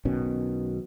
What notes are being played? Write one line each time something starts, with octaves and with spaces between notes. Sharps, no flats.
B1 B2 D#3 C#4